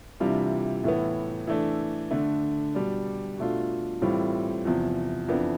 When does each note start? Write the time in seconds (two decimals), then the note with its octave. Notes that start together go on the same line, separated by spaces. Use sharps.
0.20 C3 E3 G3 D4 F4
0.84 A2 E3 B3
1.47 E3 A3 D4
2.11 D3 A3 D4
2.75 B2 G3 D4
3.38 B2 A3 D4 F4
4.02 A2 E3 G3 C4 F4
4.65 E2 C3 F3
5.28 F2 E3 B3 D4